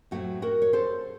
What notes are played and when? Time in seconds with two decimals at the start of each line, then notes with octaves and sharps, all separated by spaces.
0.11 A2 F#3 A3 C4 F#4
0.42 F#4 A#4
0.62 C#5
0.73 A4 C5